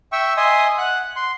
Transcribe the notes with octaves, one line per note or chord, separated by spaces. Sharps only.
E5 G5 C#6 E6
D#5 E5 G#5 C6 D#6
F#5 F#6
C6